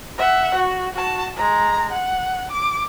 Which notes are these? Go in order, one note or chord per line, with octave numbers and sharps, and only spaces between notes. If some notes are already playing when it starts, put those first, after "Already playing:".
E5 F#5
F#4
F#4 A5
G#3 A#5
F#5
D6